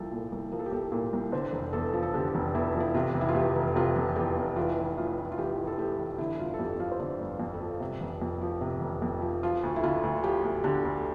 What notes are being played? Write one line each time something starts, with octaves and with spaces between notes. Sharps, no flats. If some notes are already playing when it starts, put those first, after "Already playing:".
Already playing: C2 F3 A4
A#2
C2
F3 A#4
A4
G4
C2 A4
A#2 A#4
C2
D3 C5
F1
E2 A4
F3
A4
D3 G4
F1
E2 E4
F3
E4
C3 F4
F1
E4
F4
E2 G4
F1
C3 F4
F1
E2 G4
F1
E3 F4
A1
A2 F4
A1
F4
E3 G4
A1
A4
A2 G4
A1
D3 E4
G1 F4
A4
F2 G4
F3 F5
C5
D3 D5
G1
F2
A4
F3
C3
F1
F2
F3
C3
F1
F2
F3
F3 F4
D2
E4
D3 F4
D2
F3 G4
D2
D3 G4
D2